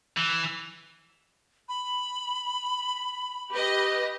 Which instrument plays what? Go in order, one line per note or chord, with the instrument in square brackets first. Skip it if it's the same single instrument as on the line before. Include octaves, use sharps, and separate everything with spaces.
[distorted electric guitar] E3
[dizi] B5
[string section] G4 B4 D#5